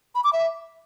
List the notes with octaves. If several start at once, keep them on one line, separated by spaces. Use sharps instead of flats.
B5
D6
E5